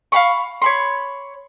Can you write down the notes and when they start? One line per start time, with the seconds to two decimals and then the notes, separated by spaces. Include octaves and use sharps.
0.12 F5 F#5 B5 C#6
0.62 C#5 B5 C6